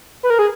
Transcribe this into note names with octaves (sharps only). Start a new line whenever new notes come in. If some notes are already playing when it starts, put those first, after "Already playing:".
B4
A#4
G#4